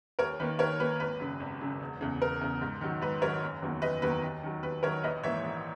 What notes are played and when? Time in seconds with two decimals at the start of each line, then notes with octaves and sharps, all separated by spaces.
0.19 D#2 A#4 C#5
0.40 D#3 A#3 B4
0.59 D#2 A#4 C#5
0.80 D#3 A#3 B4
1.00 G#1 B4
1.20 F#2 C#3
1.40 G#1
1.61 F#2 C#3
1.80 E1
2.01 E2 C#3
2.21 E1 A#4
2.41 E2 C#3
2.61 G#2
2.81 D#3 F#3
3.01 G#2 B4
3.22 D#3 F#3 A#4 C#5
3.43 F#1
3.62 E2 D#3 F#3 A#3
3.82 F#1 B4 D#5
4.02 E2 D#3 F#3 A#3 B4
4.22 D#2
4.43 D#3 F#3
4.63 D#2 B4
4.83 D#3 F#3 A#4 C#5
5.03 A#1 B4 D#5
5.23 G#2 E3 A#3 C#5 E5
5.44 A#1